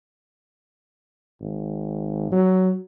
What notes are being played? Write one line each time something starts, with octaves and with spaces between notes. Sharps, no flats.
G#1
F#3